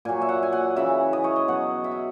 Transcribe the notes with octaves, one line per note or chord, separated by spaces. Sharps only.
A#2 F#3 G#5
E5
F#5
G#5
F#5
C#3 E3 E5
D#5
C#5
D#5
B2 F#3 F#5
E5
D#5